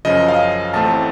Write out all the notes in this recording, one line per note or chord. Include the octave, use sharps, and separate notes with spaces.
F#2 C#3 F3 D#5
F5
A1 A2 A3 C4 A5